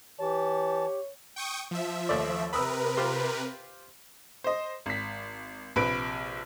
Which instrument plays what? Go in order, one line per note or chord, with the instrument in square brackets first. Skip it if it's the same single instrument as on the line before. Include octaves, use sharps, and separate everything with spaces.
[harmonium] E3 A5 [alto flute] G4 [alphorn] C#5
[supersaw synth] G5 C#6 D#6
F3 E5
[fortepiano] D#2 A3 D5
[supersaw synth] C3 A#4 B4 [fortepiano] B5 D#6 E6
[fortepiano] F4 G4 C5
[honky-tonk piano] C5 D#5
G#1 B6
A#1 C3 B4 D7